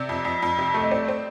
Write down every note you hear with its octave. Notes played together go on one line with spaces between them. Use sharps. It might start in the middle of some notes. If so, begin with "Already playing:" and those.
Already playing: C3 D5
F2
F2
F2
C3
A3
D#5
C4 D5
C4